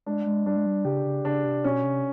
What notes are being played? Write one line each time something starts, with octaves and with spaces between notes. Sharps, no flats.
G#3 D4
G#3
G3 D4
G#3
G3
C#3 G4
C#3
C#3 D4
C3
B2 C#4
C3